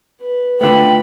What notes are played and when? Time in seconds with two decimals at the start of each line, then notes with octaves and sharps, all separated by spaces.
0.21 B4
0.61 D3 A3 B3 F4 G5 B5